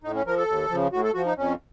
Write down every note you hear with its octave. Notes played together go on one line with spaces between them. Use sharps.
A2 D#4
C#4
F3 A#4
A4
D#2
C#3 F3
A2 F#4
A4
F3 F#4
D#4
F2 C#4